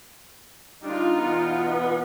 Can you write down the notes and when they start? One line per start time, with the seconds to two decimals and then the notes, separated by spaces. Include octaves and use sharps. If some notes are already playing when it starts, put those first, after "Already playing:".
0.82 D3 G3 D4 D#4 F4
1.18 E2 B2 B3